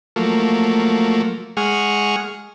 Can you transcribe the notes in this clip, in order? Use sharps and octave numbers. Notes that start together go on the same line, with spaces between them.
F3 F#3 A3 A#3
G#3 G#4 F#5 C#6 F6